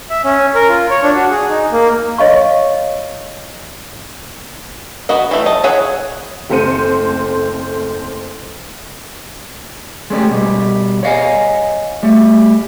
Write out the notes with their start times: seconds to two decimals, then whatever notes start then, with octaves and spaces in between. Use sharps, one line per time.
0.10 E5
0.24 C#4
0.55 A#4
0.68 F4
0.91 C#5
1.02 D4
1.15 F#4
1.30 G#4
1.49 D#4
1.72 A#3
2.18 C#5 D#5 F5 C#6
5.09 B3 F#4 D#5
5.31 E3 A3
5.46 D#5 A5
5.64 E4 G#4 C#5 F#5
6.50 F#1 A3 C4 C5 C#7 D#7
10.10 G#3 A3 C#4 G4
10.30 B2 G3
11.03 C#5 D#5 F5 F#5 G#5
12.03 G3 A3